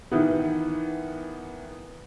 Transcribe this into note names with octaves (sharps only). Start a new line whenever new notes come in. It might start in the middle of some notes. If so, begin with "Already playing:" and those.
D#3 E3 B3